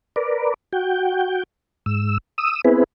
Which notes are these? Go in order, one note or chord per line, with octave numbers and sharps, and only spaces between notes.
A#4 B4 D5
F#4 G5
G#2 E6
D#6 E6
B3 C4 E4 G#4 B4